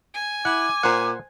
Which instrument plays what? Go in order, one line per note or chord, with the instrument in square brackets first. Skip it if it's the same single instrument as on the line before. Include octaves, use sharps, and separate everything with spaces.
[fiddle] G#5
[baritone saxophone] E4 [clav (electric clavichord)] F#5 [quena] D6
[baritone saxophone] A#2 [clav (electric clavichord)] C5 F#5